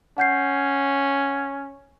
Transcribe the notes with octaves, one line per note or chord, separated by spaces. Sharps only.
C#4 F#5 G6 C7